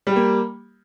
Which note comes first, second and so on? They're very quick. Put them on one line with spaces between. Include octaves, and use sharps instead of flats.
G3 G4 A#3